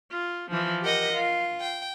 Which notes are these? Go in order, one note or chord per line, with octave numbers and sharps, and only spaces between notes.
F4
E3 F3
G4 A#4 D#5 F#5
F4
G5